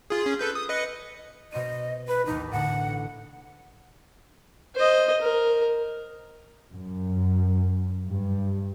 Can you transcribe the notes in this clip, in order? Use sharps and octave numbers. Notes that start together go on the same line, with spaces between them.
F4 G#4
C#4 G#4
A4 B4 G6
D#6
B4 D#5 C#7
B2 C5 D#5 D#7
B4 B5
A1 D#2 D#4
A2 D3 F#5
C5 D#5
A#4
F#2
G2